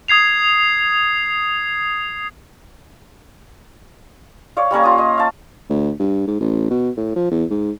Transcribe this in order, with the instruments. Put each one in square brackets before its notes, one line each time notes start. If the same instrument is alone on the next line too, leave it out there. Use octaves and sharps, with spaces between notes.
[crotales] D#6 G#6 C7 F7
[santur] C#5 D5 F5
G3 A#3 C#4 A#4
F4 D#6
D#5
F5 A5
[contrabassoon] D2
G2
G#2
A1
B2
A2
F3
E2
G#2